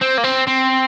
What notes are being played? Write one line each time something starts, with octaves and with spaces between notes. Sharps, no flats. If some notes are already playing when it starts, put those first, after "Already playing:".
C4
A#3
C4
C4